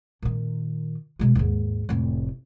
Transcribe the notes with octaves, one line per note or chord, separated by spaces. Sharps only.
A#2 D#3
B2 G#3
D#2 G#2
F1 A2